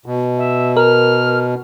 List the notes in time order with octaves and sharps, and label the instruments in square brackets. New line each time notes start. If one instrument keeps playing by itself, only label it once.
[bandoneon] B2
[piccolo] E5
[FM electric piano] A#4 [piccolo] F6